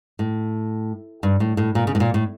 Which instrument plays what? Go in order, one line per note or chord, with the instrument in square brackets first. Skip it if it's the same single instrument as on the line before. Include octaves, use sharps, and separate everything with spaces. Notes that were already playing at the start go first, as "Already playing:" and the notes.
[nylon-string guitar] A2
G2
A2
A2
A#2
C#3
A2
A#2
A2